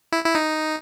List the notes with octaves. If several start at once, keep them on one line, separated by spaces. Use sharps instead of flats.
E4
E4
D#4